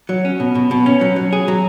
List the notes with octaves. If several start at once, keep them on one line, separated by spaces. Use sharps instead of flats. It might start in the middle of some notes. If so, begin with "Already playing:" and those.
F#3
C#4
B2
B2
B2
C#4
F#3
F#3
G#4
F#3